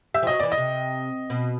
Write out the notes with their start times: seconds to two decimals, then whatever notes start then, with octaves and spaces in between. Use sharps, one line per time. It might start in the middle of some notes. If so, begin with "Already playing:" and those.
0.14 G3 E5
0.23 F3
0.27 F#3 D#5
0.40 E3 D5
0.52 D#5
0.58 C3
1.30 B2